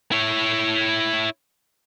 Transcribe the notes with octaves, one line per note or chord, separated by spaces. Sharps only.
E4 C#5